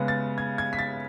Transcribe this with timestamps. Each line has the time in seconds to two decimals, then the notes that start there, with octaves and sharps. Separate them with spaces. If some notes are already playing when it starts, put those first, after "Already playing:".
Already playing: C#3 G#3 B3
0.08 A6
0.38 G#6
0.58 G#6
0.73 B6
0.79 A6